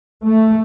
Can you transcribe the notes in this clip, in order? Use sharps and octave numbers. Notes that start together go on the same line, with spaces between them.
A3